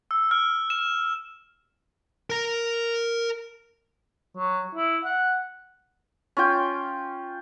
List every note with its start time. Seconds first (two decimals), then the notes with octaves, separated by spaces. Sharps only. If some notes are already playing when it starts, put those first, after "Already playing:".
0.11 E6
0.31 F6
0.70 E7
2.30 A#4 A#5
4.37 F#3
4.75 E4
5.04 F#5
6.37 C#4 F4 G5